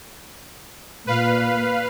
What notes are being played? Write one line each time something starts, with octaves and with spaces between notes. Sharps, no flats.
A#2 B4 F5